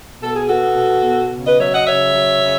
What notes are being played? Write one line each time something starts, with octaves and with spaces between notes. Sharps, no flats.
B2 A4
G#4
B3 F#4 A4
B2
B2
C#3
B4 D#5
F#3 C#5 E5
D#5 F#5
C#3 C#5 E5
F#3
C#3